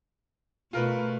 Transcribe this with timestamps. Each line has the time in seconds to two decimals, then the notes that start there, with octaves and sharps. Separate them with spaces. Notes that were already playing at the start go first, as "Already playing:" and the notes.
0.73 B2 A3 F4 A#4 B4